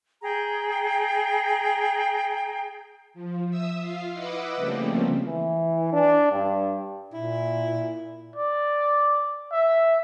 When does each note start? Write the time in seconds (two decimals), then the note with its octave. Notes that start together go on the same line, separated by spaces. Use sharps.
0.22 G#4 G5 A#5
3.14 F3
3.50 E5 D#6 E6
3.80 F4 F5
4.13 E4 B4 D#5 F#5 D6 E6
4.56 C#3 F3 G3 A3 A#3 C4
5.26 E3
5.93 D4
6.31 G2
7.13 A#2 E4
8.36 D5
9.52 E5